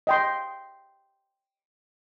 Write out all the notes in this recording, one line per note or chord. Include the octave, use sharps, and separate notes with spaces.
D#5 G5 C6